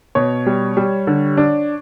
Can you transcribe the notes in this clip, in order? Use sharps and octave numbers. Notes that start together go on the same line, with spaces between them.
B2 C#5
G3
G3
D3
D4